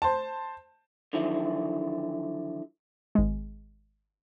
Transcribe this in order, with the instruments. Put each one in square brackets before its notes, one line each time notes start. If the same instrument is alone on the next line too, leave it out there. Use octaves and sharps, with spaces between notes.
[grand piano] C5 A5
[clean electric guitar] D3 D#3 F3 F#3 E4
[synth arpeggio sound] G#1 G#3